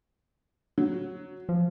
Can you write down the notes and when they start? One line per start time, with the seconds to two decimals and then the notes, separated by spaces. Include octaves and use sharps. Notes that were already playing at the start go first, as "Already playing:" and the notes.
0.78 F#3
1.49 F3